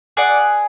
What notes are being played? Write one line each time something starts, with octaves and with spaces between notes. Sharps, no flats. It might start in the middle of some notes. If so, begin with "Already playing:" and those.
G#4 D5 F#5